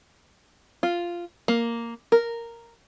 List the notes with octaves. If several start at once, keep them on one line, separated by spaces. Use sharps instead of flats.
F4
A#3
A#4